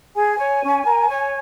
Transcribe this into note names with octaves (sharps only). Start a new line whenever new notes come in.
G#4 G#5
C#5
C#4
A#4
C#5